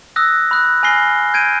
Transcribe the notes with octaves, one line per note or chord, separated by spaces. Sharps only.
D#6 E6 F#6 A#6
B5 D#6 F#6
G#5 B5 F6 A#6 C7 G7
G6 G#6 D7 D#7